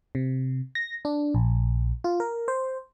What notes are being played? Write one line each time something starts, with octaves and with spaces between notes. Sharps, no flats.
C3
A#6
D4
A#1
F4
A#4
C5